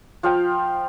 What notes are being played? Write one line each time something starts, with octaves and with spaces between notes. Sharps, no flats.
F3 F5 G5